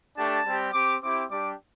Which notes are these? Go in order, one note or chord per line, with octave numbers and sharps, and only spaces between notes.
A3 D4 G4 A5
G3 C4 G4
C4 G4 D6
C4 E4 G4 D6
G3 D4 G4 D6